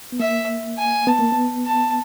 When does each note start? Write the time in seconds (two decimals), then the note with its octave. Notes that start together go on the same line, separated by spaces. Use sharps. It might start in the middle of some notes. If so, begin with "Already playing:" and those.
0.12 B3
0.19 A#3 E5
0.78 G#5
1.07 B3 A5
1.19 A#3
1.32 B3
1.65 A5